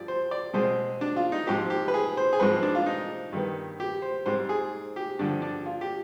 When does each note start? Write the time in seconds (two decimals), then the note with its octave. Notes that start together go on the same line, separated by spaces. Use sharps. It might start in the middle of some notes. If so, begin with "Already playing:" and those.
Already playing: G2 F3 D5
0.08 C5
0.31 D5
0.54 B2 G#3 C4 C5
1.01 D4
1.16 F4
1.32 D#4
1.47 G#2 F3 C4 G4
1.70 G4
1.88 B4
1.94 G#4
2.17 C5
2.33 G#4
2.40 G#2 F3 G#3 C4 B4
2.63 D4
2.75 F4
2.86 D#4
3.32 G2 D#3 B3
3.80 G4
4.02 C5
4.26 G#2 G3 C4 C5
4.49 G#4
4.96 G4
5.19 G2 D3 F3 D4
5.42 D4
5.66 F4
5.81 G4